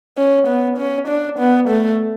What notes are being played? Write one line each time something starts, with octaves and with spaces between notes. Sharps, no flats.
C#4
B3
C#4
D4
B3
A3